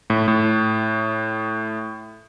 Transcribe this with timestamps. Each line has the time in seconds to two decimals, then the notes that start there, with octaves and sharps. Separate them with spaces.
0.10 A2
0.28 A2